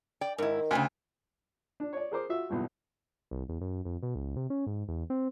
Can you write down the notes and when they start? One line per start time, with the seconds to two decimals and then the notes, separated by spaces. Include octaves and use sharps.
0.21 D5 G5
0.38 G#2 D#3 E4
0.71 D2 C#3 G5 G#5
1.80 D4
1.93 C#5 D5
2.11 G#4 A#4 C5 D6
2.29 F4 F#4 E5
2.49 B1 E2 G2 A#2
3.31 C2
3.49 E2
3.61 F#2
3.85 F2
4.03 B2
4.15 C#2
4.36 C3
4.50 C#4
4.67 G#2
4.88 E2
5.10 C4